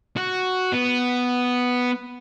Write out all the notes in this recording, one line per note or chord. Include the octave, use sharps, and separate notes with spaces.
F#4
B3